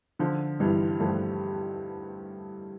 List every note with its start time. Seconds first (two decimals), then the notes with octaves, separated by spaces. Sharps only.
0.19 D3 F3
0.60 G2 E3 G3
1.00 G2 F3 A3